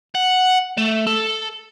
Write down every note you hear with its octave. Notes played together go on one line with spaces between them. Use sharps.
F#5
A3
A4